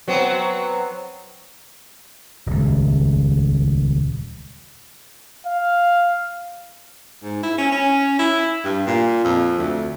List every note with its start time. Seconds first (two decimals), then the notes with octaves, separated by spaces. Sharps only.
0.08 F#3 B3 C4
2.46 D#1 C#2
5.46 F5
7.23 G#2
7.43 E4
7.58 C#4
7.72 C#4
8.19 E4
8.64 G2
8.87 A#2
9.24 F2
9.59 D2